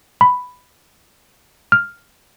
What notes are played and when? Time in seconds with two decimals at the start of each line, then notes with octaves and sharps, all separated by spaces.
0.21 B5
1.72 F6